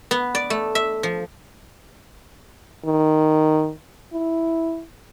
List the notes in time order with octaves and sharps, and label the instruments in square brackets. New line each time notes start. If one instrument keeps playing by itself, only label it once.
[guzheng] B3
D5
A3
E5
F3
[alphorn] D#3
E4